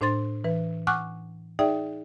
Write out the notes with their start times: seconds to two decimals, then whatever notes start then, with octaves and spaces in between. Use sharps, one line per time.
0.01 A2 D4 C5 C6 A6
0.44 E3 B4
0.87 F#5 G#5 C#6 D6 F6 F#6
1.59 D#4 G#4 D5 E5 G5